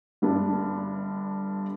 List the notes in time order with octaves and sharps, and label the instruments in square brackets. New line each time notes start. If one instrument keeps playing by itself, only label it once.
[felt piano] G1 G2 D4